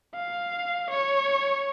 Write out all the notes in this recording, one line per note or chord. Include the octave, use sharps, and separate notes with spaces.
F5
C#5